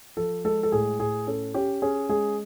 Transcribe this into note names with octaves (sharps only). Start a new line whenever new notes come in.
F3 A4
G#3 A4
A4
A2 G#4
A2 G#4
C#4 A4
C#4 G4
C#4 G#4
G#3 G#4